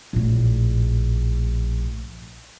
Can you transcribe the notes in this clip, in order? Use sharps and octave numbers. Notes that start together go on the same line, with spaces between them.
A#1 A2